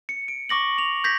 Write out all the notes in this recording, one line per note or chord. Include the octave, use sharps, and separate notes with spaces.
C#7
D7
C#6 D6 A#6 F#7
F7
G6 G#6 A#6 B6